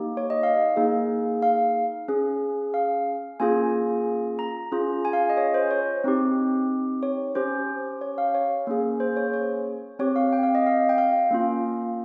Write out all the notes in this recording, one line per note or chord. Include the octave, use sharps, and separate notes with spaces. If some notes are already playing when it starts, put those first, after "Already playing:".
Already playing: A#3 D#4 G4
C#5
D#5
F5
A#3 D#4 G#4
F5
C#4 G#4
F5
A#3 C#4 F4 G#4 G#5
A#5
C#4 F4 G#4
G#5
F5
D#5
C#5
C5
C#5
C4 D#4 G4
C#5
C#4 G4 C5
C#5
F5
C#5
A#3 C#4 G#4
C5
C#5
C#5
C4 G4 C#5
F5
G5
F5
D#5
F5
G5
F5
A#3 C#4 F4